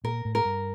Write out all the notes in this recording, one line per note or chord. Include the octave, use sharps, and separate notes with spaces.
A#2 A#4
A2
A#4
G2